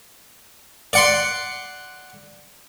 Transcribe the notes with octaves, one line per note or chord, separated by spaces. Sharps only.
D5 F#5 C6